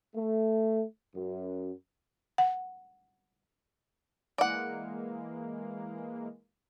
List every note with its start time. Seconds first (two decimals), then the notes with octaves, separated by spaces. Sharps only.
0.15 A3
1.15 F#2
2.38 F#5
4.38 E3 G#3 A#3 D5 F#5